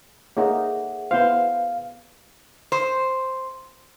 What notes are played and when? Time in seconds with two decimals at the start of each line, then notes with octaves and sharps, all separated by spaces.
0.37 A#3 D#4 G#4 A4 C#5 E5 F#5
1.11 B3 E4 C5 F5
2.72 C5